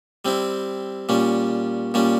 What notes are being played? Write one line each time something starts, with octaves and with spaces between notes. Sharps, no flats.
G3 C4 E4
A#2 G3 C#4
A#2 G3 C#4